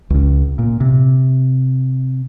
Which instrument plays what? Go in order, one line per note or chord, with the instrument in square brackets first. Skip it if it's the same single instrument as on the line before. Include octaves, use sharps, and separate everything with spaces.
[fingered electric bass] C#2 C#3
A#2
C3